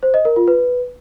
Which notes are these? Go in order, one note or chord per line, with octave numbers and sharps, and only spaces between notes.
C5
D#5
A#4
F4
B4